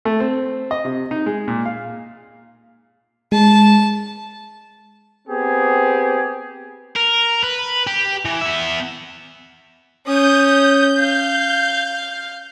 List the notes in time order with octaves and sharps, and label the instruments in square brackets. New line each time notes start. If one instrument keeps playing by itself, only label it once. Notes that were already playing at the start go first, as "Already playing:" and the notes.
[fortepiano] A3
C4
D#5
C3
D#4
G#3
A#2
F5
[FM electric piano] G#3 [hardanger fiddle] A5
[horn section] B3 C4 G4 G#4
[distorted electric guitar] A#4
B4
G4
E3
B3 E5
[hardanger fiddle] C#4 D#6 [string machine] G6
[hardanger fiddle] F5